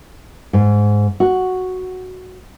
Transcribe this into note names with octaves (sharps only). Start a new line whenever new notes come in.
G#2
F#4